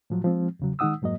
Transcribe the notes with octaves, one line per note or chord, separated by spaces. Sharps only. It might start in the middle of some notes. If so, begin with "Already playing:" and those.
A2 F3 F#3
F3 G#3 C4
E2 C#3 F#3
D#3 G#3 D#4 F#5 D#6 E6
F2 G#2 F#3 A#3 D#5